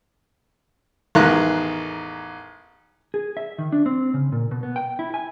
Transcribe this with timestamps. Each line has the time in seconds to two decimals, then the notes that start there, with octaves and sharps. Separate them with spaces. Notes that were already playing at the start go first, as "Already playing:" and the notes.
1.15 A1 E2 D#3 G#3 A#5 F#6
3.14 G#4
3.37 E5
3.58 D#3
3.72 D4
3.86 C4
4.14 C#3
4.32 A#2
4.51 B2
4.63 B3
4.76 G5
4.99 E4
5.14 G#5